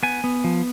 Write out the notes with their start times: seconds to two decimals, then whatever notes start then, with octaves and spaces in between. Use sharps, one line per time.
0.03 B3 G#5
0.24 B3
0.44 F3